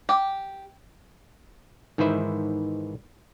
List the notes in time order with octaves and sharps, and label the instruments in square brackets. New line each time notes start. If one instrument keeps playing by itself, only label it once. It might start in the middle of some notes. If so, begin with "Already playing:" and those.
[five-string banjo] G4
[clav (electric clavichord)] G#2 D#3 E3 B4 C5 E5